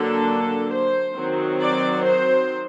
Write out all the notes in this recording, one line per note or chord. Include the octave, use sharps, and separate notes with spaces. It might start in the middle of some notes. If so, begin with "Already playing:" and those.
Already playing: D3 F#3 A#3 D4 A4
C5
D#3 F#3 C4
D5
C5